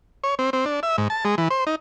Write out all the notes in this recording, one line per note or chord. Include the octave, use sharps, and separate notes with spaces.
C#5
C4
C4
D4
E5
G#2
A5
G#3
E3
C5
D#4